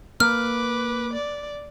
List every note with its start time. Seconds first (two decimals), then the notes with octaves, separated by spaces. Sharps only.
0.20 A#3 B4 D6 F6
1.13 D5